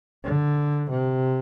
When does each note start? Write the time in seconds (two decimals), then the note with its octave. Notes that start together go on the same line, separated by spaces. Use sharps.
0.24 D3
0.90 C3